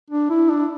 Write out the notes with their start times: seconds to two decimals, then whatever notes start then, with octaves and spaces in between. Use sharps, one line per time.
0.10 D4
0.30 E4
0.50 D4